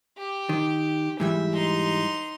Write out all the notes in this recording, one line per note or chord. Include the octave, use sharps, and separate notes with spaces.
G4
D#3
G#2 E3 G3 E5
D#4 C6